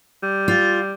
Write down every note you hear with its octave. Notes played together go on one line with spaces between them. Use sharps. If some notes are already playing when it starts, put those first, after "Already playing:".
G3
F4